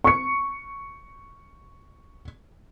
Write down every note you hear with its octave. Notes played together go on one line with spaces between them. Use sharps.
C#6 C#7